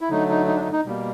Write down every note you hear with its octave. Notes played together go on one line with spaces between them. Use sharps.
E4
D3 F#3 A3 D#4
D#4
D#4
D4
D#4
D#4
B2 G3 A#3